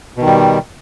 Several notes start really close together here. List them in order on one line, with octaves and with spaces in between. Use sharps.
B2 D#3 G3